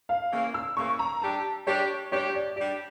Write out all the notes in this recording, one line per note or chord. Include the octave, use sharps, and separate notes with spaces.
F5
C#3 E3 A#3
E6
C#3 E3 A#3 C#6
A#5
G3 D4 G4 A5
G3 D4 G4 C#5
G3 D4 G4 C#5
D5
G3 D4 G4 D5